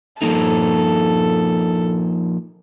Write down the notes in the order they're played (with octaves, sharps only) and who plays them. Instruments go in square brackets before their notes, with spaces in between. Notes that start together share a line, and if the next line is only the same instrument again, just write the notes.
[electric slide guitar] F3 A#3 D#4 [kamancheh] A4